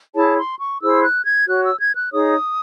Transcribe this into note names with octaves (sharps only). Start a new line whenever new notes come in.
E4 G#4 C#5 A5
C6
C#6
E4 G#4 C5 E6
F#6
G#6
F#4 C#5 F#6
E6
G#6
F#6
D#4 G#4 C#5 D#6